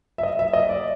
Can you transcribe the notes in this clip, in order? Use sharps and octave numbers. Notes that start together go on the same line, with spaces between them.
E5
D#5
E5
D#5
D5